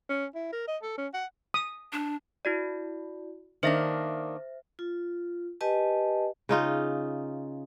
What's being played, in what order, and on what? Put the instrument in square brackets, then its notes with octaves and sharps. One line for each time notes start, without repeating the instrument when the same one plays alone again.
[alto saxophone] C#4
E4
A#4
D#5
A4
C#4
F#5
[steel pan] D#6
[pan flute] D4
[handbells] E4 F#4 D5
[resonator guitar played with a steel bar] D#3 A#3 D4 [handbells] C5 E5 A#6
[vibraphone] F4
G4 B4 D#5 G#5 A5
[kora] C#3 D#4 F4